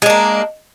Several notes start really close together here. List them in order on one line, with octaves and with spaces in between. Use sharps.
G#3 D4 A#3